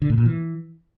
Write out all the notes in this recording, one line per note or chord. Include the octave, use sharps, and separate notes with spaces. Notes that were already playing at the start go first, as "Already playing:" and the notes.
D3
A2
A#2
E3